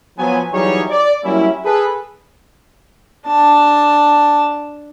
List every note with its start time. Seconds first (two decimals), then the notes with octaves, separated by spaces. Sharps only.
0.18 F3 F#3 B3 G#5
0.53 E3 F#3 G3 D#4 G#4 C#5
0.90 D5
1.24 F#3 G3 A#3 C#4 E4
1.65 G#4 A4 B4
3.27 D4 A5